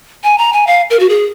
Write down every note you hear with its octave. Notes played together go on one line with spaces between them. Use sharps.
G#5
A#5
G#5
F5
A#4
F#4
G#4